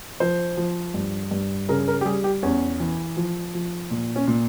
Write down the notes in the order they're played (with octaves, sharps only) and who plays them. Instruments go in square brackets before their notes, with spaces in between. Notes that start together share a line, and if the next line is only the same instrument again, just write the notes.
[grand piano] F3 C5
F3
G2
G2
C#3 A#4
A#4
G4
G3 G#4
G4
E2 C#4
E3
F3
F3
A#2
C#4
A#2